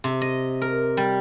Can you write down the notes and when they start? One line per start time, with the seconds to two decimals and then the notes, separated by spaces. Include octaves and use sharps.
0.04 C3
0.22 D#5
0.62 A#4
0.97 G3